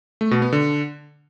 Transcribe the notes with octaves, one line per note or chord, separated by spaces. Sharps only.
A3
B2
B3
D3